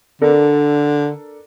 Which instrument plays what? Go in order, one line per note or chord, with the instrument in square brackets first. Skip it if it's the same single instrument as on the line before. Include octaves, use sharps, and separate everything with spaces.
[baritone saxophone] D3 [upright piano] D4 A4 A#4